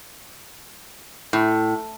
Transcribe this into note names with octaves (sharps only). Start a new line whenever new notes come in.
A2